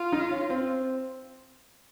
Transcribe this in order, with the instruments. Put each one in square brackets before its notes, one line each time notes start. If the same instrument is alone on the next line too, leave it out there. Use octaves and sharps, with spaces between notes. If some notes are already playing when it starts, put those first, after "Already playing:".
Already playing: [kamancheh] F4
[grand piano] D#4
C#4
C4